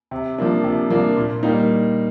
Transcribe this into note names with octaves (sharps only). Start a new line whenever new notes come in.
C3
F3 A#3 D4
C3
F3 A#3 D4
A#2
G3 A#3 D#4